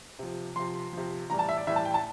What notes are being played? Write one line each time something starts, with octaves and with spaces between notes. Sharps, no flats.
C3 F3
C3 F3 C6
C3 F3
A2 E3 G3 A#5
A5
E5
D5
A2 E3 G3 E5
A5
G5
A5